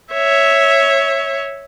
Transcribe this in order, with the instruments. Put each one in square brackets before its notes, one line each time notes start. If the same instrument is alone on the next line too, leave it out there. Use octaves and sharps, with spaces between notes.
[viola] C#5 E5